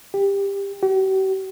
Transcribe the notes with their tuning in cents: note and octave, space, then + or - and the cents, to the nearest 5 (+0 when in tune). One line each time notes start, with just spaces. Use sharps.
G4 +20
G4 -45